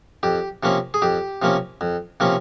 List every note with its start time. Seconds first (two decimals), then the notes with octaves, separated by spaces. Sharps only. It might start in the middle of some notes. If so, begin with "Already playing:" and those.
0.23 F2 G4
0.63 C3 F3 A#3 C#4
0.94 G#4
1.02 F2 G4
1.42 C3 F3 A#3 C#4
1.81 F2
2.20 C3 F3 A#3 C#4